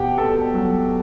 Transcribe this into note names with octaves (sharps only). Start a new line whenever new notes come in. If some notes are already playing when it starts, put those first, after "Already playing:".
Already playing: E2 B2 G4 F#5 G5
B3 A4 A5
F#3